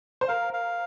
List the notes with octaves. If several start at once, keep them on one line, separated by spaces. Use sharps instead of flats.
C5
A#4 F5
F5